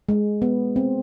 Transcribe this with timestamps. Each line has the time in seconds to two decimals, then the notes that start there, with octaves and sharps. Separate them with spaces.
0.09 G#3
0.42 B3
0.76 C4